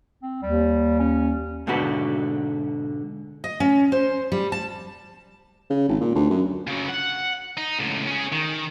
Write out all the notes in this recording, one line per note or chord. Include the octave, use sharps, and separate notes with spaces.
C4
D#2 G3
C#4
G#2 B2 D3 F#4 B4
D#5
C#4
C5
G3
A5
C#3
G#1
A#2
D2
F#2
C#3 F#3
F#5
D#4
C#2 A2
C#4 G#4
D#3